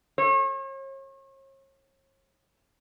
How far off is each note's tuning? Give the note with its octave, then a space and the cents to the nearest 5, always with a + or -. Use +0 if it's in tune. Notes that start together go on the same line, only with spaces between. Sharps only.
C#5 -40